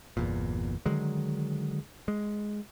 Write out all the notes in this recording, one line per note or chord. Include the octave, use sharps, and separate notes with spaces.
G1 E2 A#2
D3 D#3 F#3 G#3
G#3